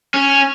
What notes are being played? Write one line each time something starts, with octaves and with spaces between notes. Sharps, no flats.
C#4